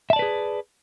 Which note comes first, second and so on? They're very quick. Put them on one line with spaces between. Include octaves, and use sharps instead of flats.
E5 A5 D5 B4 G#4